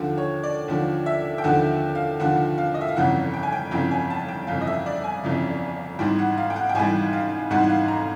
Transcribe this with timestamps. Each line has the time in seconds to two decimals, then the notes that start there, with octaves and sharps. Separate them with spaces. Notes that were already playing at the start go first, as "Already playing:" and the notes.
Already playing: D#2 D3 F3
0.18 C#5
0.43 D5
0.68 D#2 D3 F3
1.06 E5
1.38 G5
1.44 D#2 D3 F3 F#5
1.95 F5
2.20 D#2 D3 F3 F#5
2.58 F5
2.74 D#5
2.81 E5
2.89 F5
2.95 G1 F2 C#3 E3 F#5
3.34 G5
3.43 G#5
3.52 G5
3.71 G1 F2 C#3 E3 G5
3.91 G#5
4.10 A5
4.29 G5
4.47 G1 F2 C#3 E3 F5
4.61 D#5
4.67 E5
4.86 D5
5.04 G#5
5.24 G1 F2 C#3 E3
5.99 G#1 G#2 E3 G3 G5
6.19 F#5
6.38 F5
6.50 G5
6.56 F#5
6.69 G5
6.75 G#1 G#2 E3 G3 G#5
7.13 F5
7.51 G#1 G#2 E3 G3 F#5
7.64 F#5
7.70 F5
7.88 A#5